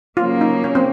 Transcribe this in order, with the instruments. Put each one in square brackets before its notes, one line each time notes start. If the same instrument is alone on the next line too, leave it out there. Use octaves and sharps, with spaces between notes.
[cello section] C#3 F#3 A#3 [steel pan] F4
[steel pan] D#4
C#4
C4